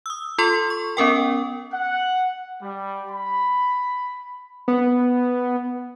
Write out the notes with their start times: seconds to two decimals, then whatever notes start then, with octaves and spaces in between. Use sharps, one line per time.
0.06 D#6 E6
0.38 F4 A4 C6
0.70 C#6
0.97 B3 C#4 A#4 G5
1.72 F#5
2.62 G3
3.11 B5
4.68 B3